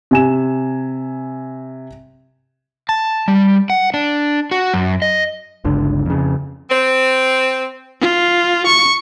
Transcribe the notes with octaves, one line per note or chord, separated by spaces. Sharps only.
C3 G#5 E7
A5
G3
F#5
D4
F#4
F#2
D#5
G1 C#2 D3
F2 C#3
C4
F4
C#6